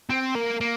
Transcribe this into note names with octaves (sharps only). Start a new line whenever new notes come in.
C4
A#3
A#3